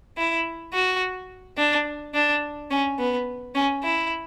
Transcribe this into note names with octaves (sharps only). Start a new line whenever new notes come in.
E4
F#4
D4
D4
C#4
B3
C#4
E4